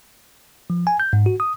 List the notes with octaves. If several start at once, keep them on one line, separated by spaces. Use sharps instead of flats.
F3
G#5
G6
G#2
F#4
D#6